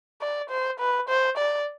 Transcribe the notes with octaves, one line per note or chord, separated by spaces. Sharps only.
D5
C5
B4
C5
D5